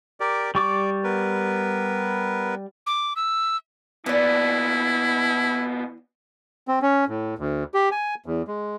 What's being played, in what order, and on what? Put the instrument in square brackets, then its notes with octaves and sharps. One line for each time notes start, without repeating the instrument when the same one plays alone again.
[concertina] G4 A#4 D5
[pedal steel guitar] G3 C#6 D6 [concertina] D5
[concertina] B3 A#4 B4
[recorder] D6
E6
[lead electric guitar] A#2 B3 [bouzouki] E3 D5 [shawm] E4
[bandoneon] C4
C#4
A2
D2
G4
G#5
E2
G#3